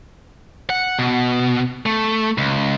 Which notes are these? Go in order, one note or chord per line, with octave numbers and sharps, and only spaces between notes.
F#5
B2
A3
C#2